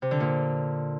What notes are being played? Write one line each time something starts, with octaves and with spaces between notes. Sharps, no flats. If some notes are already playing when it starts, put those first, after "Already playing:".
C3
D3
A#2